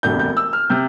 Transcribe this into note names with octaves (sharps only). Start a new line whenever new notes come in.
E1 D2 C3 G6
G6
E6
F6
C3 G6